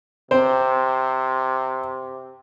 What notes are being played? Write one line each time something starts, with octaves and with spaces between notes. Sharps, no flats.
C3 C4 C5